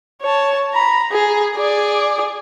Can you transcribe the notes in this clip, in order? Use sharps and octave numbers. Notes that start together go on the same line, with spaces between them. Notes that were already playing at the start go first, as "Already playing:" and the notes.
C#5 A5
A#5 B5
G#4
G#4 D5